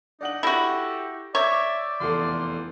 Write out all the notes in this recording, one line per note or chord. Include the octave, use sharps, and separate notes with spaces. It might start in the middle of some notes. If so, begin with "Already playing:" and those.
D4 D#4 D5 F#5 F#7
E4 F#4 G4 A4 G6 A#6
C#5 D5 E5 D6 G6 A6
F1 E2 A4 C6